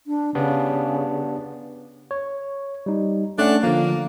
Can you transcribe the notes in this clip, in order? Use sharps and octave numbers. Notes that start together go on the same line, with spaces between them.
D4
C#3 B3 D4 G4
C#5
G3 D#4
A3 C#4 D4 F#5
D3 F3 A#3